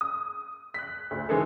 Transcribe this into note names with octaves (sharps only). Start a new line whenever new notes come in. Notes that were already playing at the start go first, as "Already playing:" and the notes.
D#6
F#6 B6
D2
D#3 E3 G#3 G#4 A4